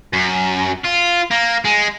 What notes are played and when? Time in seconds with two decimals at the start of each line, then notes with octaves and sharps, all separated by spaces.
0.13 F#2
0.85 F4
1.31 A#3
1.65 G#3